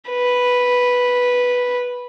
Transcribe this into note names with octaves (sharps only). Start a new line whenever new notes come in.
B4